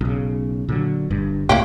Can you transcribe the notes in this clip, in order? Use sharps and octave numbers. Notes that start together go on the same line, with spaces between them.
B1 C#3
A#2 D3 F#3
G1 G2
C#2 A2 C3 A#3 E4 G4